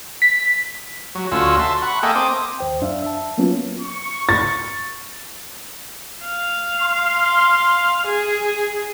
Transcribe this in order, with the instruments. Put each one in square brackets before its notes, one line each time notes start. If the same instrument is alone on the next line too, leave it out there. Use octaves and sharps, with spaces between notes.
[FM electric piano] B6
[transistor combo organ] F#3
D2 C#4 F4 F#4 E6
E5 A5 C6
F#5 B5 C#6
A#3 A4 D#5 E5 G5 G#5
C4 D6 D#6
[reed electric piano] D#2 C5 G5
F#2 D4 E5 F5
E5 A5
F#3 A#3 B3 C#4 F4
[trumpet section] C#6
[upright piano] A6
[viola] F5
[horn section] C6
[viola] G#4